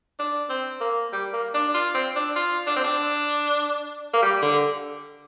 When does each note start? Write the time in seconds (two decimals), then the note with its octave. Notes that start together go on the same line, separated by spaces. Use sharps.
0.19 D4
0.49 C4
0.80 A#3
1.13 G3
1.33 A#3
1.54 D4
1.74 F4
1.95 C4
2.16 D4
2.36 F4
2.67 D4
2.76 C4
2.84 D4
4.14 A#3
4.22 G3
4.42 D3